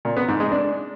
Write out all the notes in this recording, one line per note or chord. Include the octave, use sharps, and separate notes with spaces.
A#2
B3
G#2
G#3
D4